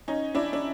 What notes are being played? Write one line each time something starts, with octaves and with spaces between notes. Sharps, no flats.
C#4 D#4
D4 E4
D4